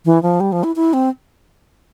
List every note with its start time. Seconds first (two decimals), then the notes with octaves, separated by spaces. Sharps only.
0.05 E3
0.23 F3
0.40 G3
0.52 F3
0.64 E4
0.76 E4
0.93 C4